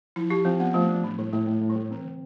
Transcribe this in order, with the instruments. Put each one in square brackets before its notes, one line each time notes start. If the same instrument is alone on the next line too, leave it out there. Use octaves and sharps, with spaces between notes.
[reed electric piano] F3 [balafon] E4
[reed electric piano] F3 [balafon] G4
[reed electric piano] F3 [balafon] C4
[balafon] B3 [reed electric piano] D4
[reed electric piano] F3 [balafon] A3
[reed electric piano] D4
[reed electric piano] A2 [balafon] F3
[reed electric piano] A2 [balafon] G3
[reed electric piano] A2 [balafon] A3
[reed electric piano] A2 [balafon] A3
[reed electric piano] A2
[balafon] G3
[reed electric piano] A2
[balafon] E3 [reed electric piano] C4
[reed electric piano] D3